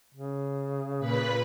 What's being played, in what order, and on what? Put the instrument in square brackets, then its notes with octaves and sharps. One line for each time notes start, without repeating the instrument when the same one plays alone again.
[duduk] C#3
[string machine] A#2 B4 B5